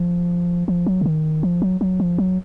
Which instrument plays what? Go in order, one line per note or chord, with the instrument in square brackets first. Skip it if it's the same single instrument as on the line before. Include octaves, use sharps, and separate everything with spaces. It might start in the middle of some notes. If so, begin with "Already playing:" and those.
Already playing: [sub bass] F3
F3
F#3
C#3
D#3
F3
F#3
F#3
F3
F#3